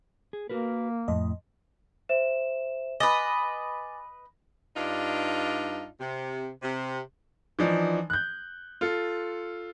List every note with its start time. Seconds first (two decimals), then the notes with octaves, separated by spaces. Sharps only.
0.33 G#4
0.50 A#3 F#4 A#4 B4
1.08 F2 A2 D#5
2.09 C5 E5 E7
3.00 B4 D#5 G#5 D6 A6
4.76 G2 D4 D#4 F4
5.99 C3
6.62 C3
7.59 E3 F3 D4 D#4
8.10 F#6 G6
8.81 F4 A4